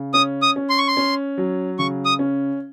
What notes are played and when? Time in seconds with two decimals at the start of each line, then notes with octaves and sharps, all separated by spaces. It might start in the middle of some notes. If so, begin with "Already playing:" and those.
Already playing: C#3
0.14 C#4 D#6
0.42 D#6
0.56 C#4
0.70 C6
0.78 C#6
0.87 C6
0.97 C#4
1.38 F#3
1.79 C#3 C#6
2.06 D#6
2.19 C#4